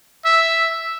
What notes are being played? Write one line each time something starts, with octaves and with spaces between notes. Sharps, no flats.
E5